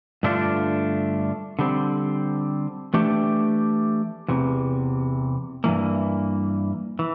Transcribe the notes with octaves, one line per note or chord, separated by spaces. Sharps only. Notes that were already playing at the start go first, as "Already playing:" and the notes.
G2 D3 A3 D4 F4
D3 G3 C4
E3 A3 D4 G4
E2 C3 E3
G2 E3 A#3
E3